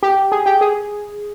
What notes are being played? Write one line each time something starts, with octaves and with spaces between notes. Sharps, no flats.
G4
G#4
G4
G#4